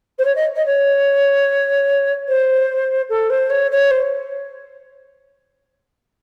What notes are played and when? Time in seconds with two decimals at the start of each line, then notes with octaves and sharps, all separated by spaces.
0.18 C5
0.24 C#5
0.35 D#5
0.55 D#5
0.65 C#5
2.28 C5
3.09 A4
3.30 C5
3.50 C#5
3.71 C#5
3.90 C5